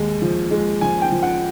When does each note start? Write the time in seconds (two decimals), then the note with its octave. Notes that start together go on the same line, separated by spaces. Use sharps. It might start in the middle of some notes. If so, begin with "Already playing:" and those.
Already playing: D#2 G#3
0.22 F3
0.51 G#3
0.81 F3 G#5
1.02 G5
1.12 F3
1.22 F#5